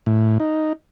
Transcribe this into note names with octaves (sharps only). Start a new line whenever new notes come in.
A2
D#4